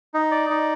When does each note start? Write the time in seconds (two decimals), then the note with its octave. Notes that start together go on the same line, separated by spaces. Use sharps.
0.14 D#4
0.31 D5
0.50 D#4